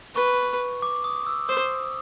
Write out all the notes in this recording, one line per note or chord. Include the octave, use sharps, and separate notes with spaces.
B4 C#6
D6
D#6
E6
C5 D#6